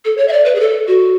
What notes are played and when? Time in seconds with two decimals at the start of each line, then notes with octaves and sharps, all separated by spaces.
0.05 A4
0.18 C#5
0.28 E5
0.33 D5
0.45 B4
0.55 G#4
0.60 A4
0.87 F#4